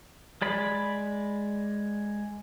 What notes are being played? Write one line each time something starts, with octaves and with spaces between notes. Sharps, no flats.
G#3 D5 B5